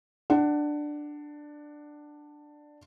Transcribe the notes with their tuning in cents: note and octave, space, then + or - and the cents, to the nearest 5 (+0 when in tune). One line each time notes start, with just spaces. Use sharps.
D4 +10 F#5 +20